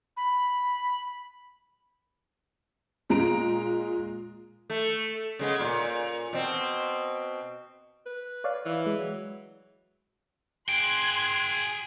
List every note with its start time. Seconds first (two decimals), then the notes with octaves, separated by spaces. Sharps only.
0.17 B5
3.10 A#2 G#3 A#5 D7
4.70 A3
5.39 C#3 G#3 B3
5.60 A#2
6.33 B2 C4
8.07 B4
8.44 C#5 D5 F5
8.66 E3
8.86 G#3
9.00 F#3
10.69 G#4 G5 C6 F#6 G#6 D7